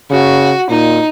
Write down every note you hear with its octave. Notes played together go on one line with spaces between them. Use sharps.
C#3 F#4
A#2 D#4